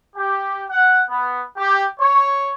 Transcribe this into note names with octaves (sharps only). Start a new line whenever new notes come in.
G4
F#5
B3
G4
C#5